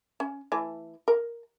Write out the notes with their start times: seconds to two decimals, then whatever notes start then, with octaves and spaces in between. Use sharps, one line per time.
0.20 C#4
0.52 E3 A3 G#5
1.08 A#4